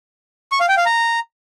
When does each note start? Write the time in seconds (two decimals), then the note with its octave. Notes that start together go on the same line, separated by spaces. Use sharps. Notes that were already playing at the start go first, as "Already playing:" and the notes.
0.52 C#6
0.60 F5
0.69 G5
0.77 F5
0.86 A#5